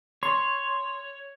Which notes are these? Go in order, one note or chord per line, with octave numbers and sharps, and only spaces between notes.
C#5 C6